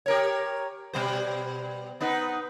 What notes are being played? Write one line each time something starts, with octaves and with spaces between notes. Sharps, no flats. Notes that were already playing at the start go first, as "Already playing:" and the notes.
G4 A#4 C#5
B2 G3 C5
B3 D#4 B4